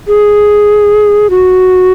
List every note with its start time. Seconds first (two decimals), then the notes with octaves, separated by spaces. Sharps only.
0.08 G#4
1.30 F#4